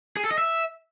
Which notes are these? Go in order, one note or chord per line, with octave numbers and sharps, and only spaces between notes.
G#4
A4
D#5
E5